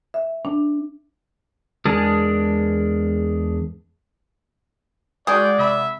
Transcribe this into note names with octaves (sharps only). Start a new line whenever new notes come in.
E5
D4
E2 G#3 D4 G#4 A#4 A5
G#3 F#4 G#4 D5 G5
C3 E5 B5